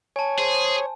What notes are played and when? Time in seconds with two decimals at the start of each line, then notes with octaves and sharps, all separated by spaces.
0.16 C#5 G#5 A5
0.38 G#4 C5